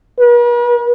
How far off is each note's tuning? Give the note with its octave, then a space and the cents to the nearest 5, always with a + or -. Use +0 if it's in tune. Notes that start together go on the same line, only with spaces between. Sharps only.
B4 -45